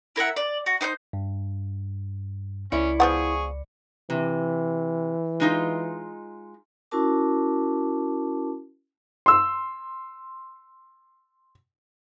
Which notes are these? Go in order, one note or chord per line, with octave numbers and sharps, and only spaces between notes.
E4 A#4 E5 F#5
D5
F#4
D#4 C5 C6 G6
G2
C#2 C#4 E4 D5 C#7
F3 B3 G#4 F#5 C#6
C3 E3
G#3 D#4 F4
C#4 E4 F#4 A#4 A5 D6
C6 E6